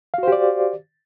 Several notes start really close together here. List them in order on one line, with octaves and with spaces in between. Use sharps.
F5 F#4 C5 G4 D5